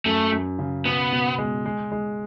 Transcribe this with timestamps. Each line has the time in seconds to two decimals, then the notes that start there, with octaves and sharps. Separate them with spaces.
0.05 F#2 A3
0.32 F#2
0.59 C#3
0.86 B2 B3
1.12 B2
1.38 G#3
1.66 G#3
1.91 G#3